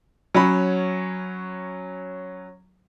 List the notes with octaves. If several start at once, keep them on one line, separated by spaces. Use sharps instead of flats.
F#3 C#4 B5